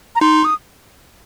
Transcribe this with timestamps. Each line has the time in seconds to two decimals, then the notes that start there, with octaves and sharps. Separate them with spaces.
0.15 A#5
0.21 D#4 C6
0.45 D#6